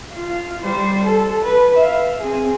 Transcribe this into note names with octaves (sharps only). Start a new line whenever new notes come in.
F4 F5
G3 C5
A4
B4
E5 F5
C4 G#4